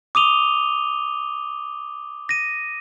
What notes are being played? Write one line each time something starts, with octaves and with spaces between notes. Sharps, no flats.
D6 D#6 D#7 F7 G7
A#6 D#7